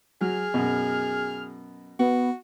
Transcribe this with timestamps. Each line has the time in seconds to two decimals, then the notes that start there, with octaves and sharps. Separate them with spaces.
0.21 F#3 G#4 F6
0.54 F#2 B2
1.99 B3 F#4